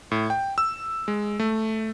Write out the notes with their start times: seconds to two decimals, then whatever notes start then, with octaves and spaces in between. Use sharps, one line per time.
0.11 A2
0.30 G5
0.58 E6
1.08 G#3
1.40 A3